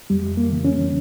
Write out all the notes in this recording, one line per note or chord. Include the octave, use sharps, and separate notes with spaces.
F2 G3
A#3
C#3 E3
C#4